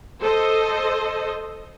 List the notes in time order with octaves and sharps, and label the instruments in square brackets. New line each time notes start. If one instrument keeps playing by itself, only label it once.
[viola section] A4 C5 D#5